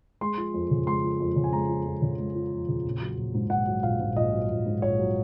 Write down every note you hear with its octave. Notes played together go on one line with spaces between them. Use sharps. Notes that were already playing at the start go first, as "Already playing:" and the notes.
G#3 C6
F3
F2
C#3
G#3 C6
F3
F2
C#3
G#5
G#3 A#5
F3
F2
C#3
G#3
F3
F2
C#3
A#1
F#3
A#1
G#2
A#1 F#5
F#3
A#1 F5
G#2
A#1 D#5
F#3
A#1
G#2
A#1 C#5
F#3